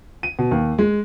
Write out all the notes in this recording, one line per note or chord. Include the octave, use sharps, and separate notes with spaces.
D#7
B2
D#2
G#3